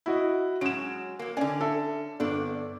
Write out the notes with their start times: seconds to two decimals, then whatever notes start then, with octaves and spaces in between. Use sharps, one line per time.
0.06 E4 F#4 D#5
0.61 F#3 G#3 C#4 D7 E7
1.19 F#3 A#3
1.37 D3 C#4 D5 G#5
1.61 A4 E5
2.20 G1 D4 A4 D5